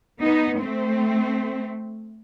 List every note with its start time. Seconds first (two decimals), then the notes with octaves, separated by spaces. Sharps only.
0.22 B3 D#4
0.59 A3 C4